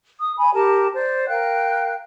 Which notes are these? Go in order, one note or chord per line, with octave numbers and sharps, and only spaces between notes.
D#6
G#5 B5
G4 A#4 A5
C5 D5
A#4 F5 G5 F#6